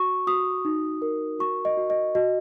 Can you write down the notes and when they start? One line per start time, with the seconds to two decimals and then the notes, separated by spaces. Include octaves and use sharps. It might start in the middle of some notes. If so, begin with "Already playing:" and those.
Already playing: F#4 C#6
0.27 F#4 D#6
0.65 D#4
1.02 A#4
1.39 F#4 C#6
1.65 D#5
1.77 F#4
1.90 D#5
2.15 F#4 D#5